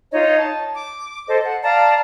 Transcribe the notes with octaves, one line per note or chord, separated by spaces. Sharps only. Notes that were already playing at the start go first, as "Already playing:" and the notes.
D#4 F4 C#5 D#5
A5
D6
A4 C5 D#5
F#5
D5 F5 A5 A#5